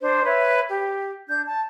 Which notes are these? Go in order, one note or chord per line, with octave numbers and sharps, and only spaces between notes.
D4 C5
B4 C#5 E5
G4
D4 G6
A5